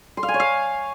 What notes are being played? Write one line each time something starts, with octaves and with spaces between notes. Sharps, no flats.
C6
F5
G#5
C#5
F5